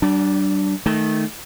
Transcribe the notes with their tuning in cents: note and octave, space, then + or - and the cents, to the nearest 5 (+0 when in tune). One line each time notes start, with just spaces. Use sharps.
G3 -40 D4 +0
D#3 +0 A3 -10